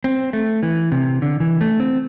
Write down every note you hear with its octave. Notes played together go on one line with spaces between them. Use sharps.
C4
A3
E3
C3
D3
E3
A3
C4